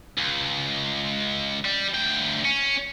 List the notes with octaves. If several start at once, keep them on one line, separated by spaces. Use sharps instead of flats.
C#2
G3
D2 G5
C#4